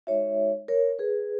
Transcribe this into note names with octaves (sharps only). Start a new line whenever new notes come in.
G#3 D#4 F#4 C#5 E5
A#4 C#5
G#4 B4